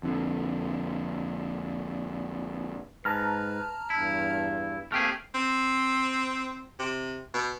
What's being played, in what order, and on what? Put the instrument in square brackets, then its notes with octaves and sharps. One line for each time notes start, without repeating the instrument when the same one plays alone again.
[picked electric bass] F2 D3
[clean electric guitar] G#2 [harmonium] B4 [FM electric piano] A5 A#5 F6
[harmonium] E2 G2 [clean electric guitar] E4
[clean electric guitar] A3 G4 G#4 [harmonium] A#3 C4 [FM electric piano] F6 C7
[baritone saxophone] C4
C3
B2